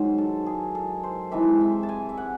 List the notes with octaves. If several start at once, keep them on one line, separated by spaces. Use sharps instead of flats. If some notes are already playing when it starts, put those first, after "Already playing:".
Already playing: G#2 D#3 F#3 C5
A4
G#4
A4
C5
C3 E3 G#3 E5
E5
A5
G#5
E5
F#5